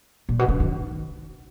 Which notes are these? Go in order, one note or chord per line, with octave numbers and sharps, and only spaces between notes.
A#2
B2
C#3
D#3